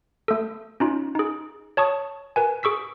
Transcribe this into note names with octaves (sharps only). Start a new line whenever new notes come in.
A3 A4
C#4 D#4 F4
D#4 G#4
C#5 A5 C#6 D#6
A#4 B4 G#5
G#4 C#6 E6 B6